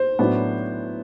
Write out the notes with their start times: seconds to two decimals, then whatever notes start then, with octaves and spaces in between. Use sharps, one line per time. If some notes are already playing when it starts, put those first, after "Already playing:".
Already playing: C5
0.19 A2 F#3 B3 D4